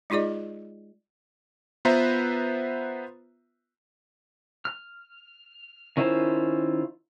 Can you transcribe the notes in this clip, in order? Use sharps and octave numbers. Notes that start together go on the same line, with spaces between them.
G#3 D#4 F4 G#4 D5 D#5
B3 F4 B4 C5 E5 A#5
F6
D#3 C#4 E4 F4 C5